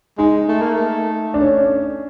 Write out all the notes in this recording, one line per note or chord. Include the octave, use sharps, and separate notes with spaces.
G#3 D#4
A3
A#3
A3
D4
C#4